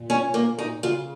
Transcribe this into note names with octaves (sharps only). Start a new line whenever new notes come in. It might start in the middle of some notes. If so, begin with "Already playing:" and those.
Already playing: A#2
C#4
A#3
D#4
C#3 F4